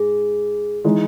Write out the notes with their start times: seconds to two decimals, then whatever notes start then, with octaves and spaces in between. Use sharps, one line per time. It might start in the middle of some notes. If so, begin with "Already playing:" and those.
Already playing: G#2 G#4
0.84 E3 G#3 D#4